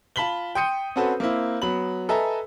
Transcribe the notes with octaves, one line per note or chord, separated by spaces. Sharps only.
F4 A5 B5 B6 F#7 G7
G5 C6 D#6 G6 C#7 D#7
C4 C#4 F#4 A4 B4 C5
A#3 C4 E4
F#3 B3 B5 F#7
A4 B4 D#5 E5 G#5 A#5